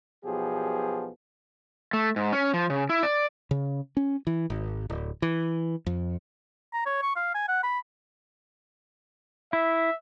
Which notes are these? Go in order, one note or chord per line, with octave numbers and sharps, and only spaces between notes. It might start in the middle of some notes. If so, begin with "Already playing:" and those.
B1 B2 F3 G4 G#4
A3
G#2
C#4
F3
C#3
E4
D5
C#3
C#4
E3
G#1
D1
E3
F2
A#5
C#5
C#6
F5
G#5
F#5
B5
E4 E5